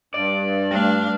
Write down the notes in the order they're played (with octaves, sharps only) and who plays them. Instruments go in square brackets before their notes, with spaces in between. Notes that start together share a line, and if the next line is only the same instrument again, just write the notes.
[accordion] G2 [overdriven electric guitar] D5
[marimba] G3 A3 [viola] D4 F5